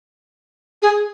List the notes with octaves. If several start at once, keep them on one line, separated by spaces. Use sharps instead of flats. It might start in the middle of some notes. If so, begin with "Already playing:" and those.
G#4